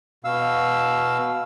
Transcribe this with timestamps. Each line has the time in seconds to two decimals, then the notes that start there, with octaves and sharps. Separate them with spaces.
0.25 B2 F5 E6